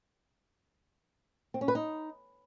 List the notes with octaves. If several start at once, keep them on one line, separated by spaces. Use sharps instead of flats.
C4
C#4
B4
D#4